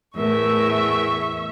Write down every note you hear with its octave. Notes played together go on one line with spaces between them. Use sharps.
E2 A2 A#4 E5 C#6